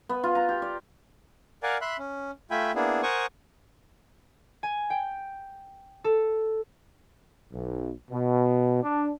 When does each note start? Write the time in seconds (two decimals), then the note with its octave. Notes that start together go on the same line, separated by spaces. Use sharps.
0.09 B3
0.24 F4
0.35 A#5
0.49 G4
0.62 D5
1.63 A#4 D5 F5 F#5 G#5
1.81 E5 B5 C6 F#6
1.99 C#4
2.51 A3 F4 E5 G5 G#5 B5
2.75 A#3 B3 D4 E4 G#4
3.03 A#4 C5 F#5 G#5 C#6 D#6
4.63 G#5
4.90 G5
6.04 A4
7.53 B1
8.11 B2
8.83 D4